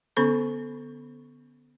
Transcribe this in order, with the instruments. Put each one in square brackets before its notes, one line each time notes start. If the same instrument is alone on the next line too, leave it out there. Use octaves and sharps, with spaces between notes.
[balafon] D3 B3 C#4 A4 B5 C#6